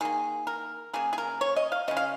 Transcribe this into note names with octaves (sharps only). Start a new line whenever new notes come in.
D#3 A#3 G#4
A#4
C#3 A#3 G#4
G#4
A#4
C#5
D#5
F5
C#3 G#3 D#5
F5